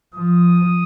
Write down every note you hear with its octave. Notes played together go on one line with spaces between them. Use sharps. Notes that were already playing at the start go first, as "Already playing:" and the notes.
F3 D#6